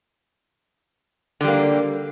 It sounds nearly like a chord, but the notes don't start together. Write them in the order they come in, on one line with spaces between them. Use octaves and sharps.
D3 G3 A#3